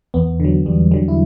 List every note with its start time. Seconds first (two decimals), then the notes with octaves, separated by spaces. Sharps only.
0.14 E2 B3
0.40 D3 F#3
0.66 E2 G3
0.91 D3 F#3 G3
1.08 E4